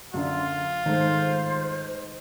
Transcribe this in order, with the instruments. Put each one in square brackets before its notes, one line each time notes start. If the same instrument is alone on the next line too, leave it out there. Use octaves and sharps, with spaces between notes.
[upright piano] F#2 D3 D4 [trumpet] F4
[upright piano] G#2 A3 [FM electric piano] D#3 [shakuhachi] C5